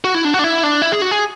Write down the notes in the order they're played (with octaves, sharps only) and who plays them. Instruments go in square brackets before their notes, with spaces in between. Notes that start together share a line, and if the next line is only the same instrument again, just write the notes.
[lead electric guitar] F#4
E4
D4
F#4
D4
E4
D4
E4
G#4
F#4
G#4